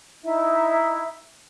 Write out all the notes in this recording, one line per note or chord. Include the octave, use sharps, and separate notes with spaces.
D#4 E4 E5